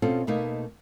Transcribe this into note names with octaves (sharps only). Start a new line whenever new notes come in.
B2 C4 C#4 F4 A4
B2 A3 A#3 D#4